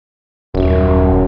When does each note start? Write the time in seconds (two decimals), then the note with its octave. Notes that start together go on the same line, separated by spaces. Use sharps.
0.55 D#1 F#2